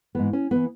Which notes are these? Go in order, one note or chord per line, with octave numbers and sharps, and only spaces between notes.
G#2 E3 B3
C#4
E3 B3